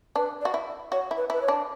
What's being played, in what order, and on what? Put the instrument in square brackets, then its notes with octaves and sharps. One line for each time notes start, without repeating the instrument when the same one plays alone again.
[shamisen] D4 [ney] B4
[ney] D5
[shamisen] F#4
E4
[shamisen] F#4 [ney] C#5
[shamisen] E4
[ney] B4
[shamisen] E4 [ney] B4
[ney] C#5
[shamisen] D4